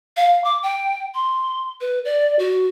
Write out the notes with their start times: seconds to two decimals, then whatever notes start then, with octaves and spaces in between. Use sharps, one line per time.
0.17 F5
0.44 D6
0.63 G5
1.14 C6
1.81 B4
2.05 D5
2.39 F#4